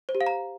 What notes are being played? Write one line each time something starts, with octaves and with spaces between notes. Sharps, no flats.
C5
G4
F5
A#5